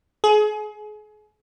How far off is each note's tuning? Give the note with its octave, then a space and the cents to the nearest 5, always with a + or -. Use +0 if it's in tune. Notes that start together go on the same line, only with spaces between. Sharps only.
G#4 +30